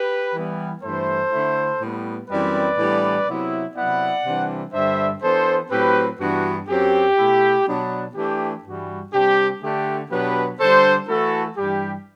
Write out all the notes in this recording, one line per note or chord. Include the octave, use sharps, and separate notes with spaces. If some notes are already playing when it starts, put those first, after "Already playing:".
Already playing: G4 B4
E3 G3 B3
G2 E3 A3 E4 A4 C5
D3 A3 E4
A2 G3 B3
F#2 E3 G3 C4 E4 B4 D5
A2 E3 G3 B3 D4
C3 F#3 B3 E4
C3 F#3 B3 E4 D5 F#5
C3 E3 G3 D4
G2 D3 G3 D4 C5 E5
E3 B3 D4 A4 C5
A2 F#3 C4 G4 B4
G2 E3 B3 D4 F#4
F#2 F#3 C4 G4
B2 A3 E4
B2 F#3 B3 D4
E3 A3 D4 G4
G2 E3 G3 F#4
C3 G3 D4 G4
D3 A3 D4 G4
B2 F#3 B3 D4 G4 B4
D3 G3 D4 A4 C5
E3 A3 E4 F#4 A4
G2 E3 G3 G4